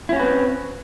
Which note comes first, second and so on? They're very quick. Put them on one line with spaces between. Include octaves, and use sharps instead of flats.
E4 C#4 F#4 B4 C4